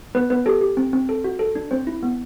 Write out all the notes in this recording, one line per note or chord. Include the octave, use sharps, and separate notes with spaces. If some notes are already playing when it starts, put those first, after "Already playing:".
B3 B4
B3 B4
G4 A4
G4
C4
C4
A4
F#4
A4
D4
C4 C5
E4
B3